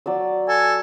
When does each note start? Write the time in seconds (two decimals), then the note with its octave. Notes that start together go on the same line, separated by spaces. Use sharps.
0.06 F#3 D5 E6
0.49 A4 G#5